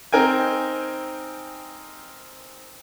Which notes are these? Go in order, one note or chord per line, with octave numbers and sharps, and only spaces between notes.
C4 D#4 A#4 G5 G#5